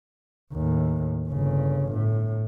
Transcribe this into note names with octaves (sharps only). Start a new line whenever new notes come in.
D#2 A2
G1 C#3
A2